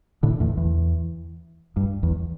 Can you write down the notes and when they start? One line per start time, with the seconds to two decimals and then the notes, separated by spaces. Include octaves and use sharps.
0.23 A2 D3
0.40 E2 A2
0.57 E2
1.77 G2
2.03 E2